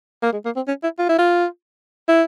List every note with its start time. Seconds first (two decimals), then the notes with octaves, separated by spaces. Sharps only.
0.23 A#3
0.33 G#3
0.45 A#3
0.56 C4
0.68 C#4
0.83 E4
0.99 F4
1.09 E4
1.19 F4
2.08 E4